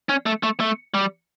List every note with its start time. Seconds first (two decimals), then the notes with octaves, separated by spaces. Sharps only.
0.09 C#4
0.26 A3
0.43 A3
0.60 A3
0.94 G3